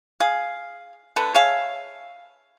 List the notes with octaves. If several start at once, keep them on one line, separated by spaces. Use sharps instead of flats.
G#4 F5
D3 A3 A4 B4
G#4 C#5 E5 F5